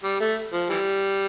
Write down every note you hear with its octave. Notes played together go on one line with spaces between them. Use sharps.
G3
A3
F3
E3 G3